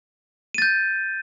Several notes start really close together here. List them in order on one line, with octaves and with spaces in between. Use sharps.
D#7 A6 G6